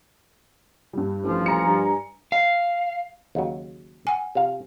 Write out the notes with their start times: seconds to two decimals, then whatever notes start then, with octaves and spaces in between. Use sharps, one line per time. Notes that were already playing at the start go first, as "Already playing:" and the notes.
0.93 G2 G3
1.23 A1 F3
1.46 G#5 A#5 C#7
1.66 G2
2.32 F5
3.35 D#2 C#3 F#3
4.07 F#5 G#5
4.35 C3 F4 F5